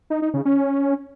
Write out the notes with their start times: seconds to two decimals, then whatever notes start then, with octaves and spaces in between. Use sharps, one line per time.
0.10 D#4
0.22 D#4
0.34 C#3
0.45 C#4